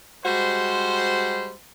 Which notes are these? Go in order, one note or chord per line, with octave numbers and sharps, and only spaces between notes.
G3 G#3 F#4 C5